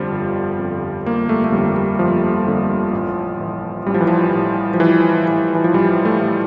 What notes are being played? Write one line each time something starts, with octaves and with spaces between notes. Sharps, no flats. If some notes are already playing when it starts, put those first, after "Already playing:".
Already playing: G1 F2 D3 F3 G3
G1
F2 D3
G1 A#3
A3
A3
F2 D3 G3
G3
G1 F3
F2 D3
A1
A2 E3
A1 G3
F3
E3
F3
A2 E3
F3
A1 E3
A2 E3
E3
F3
A1 G3
A3
A2 E3